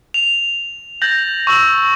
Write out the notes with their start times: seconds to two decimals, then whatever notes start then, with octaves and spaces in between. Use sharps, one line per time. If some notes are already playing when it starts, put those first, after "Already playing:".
0.14 F7
1.01 G6 A6 A#6 F#7
1.47 C#6 E6 F#7